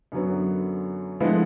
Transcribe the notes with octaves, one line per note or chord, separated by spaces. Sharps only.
F#2 D3 F#3 B3
D3 F3 G#3 B3 E4